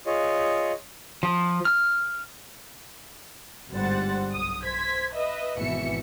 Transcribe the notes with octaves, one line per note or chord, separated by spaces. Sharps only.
F4 G#4 C#5 D#5
F3
F6
G1 G#2 G3 C5 F#5 A6
B1 D#6
C5 G#6 B6
B4 D#5 E5
G#1 B2 E3 E5 C#7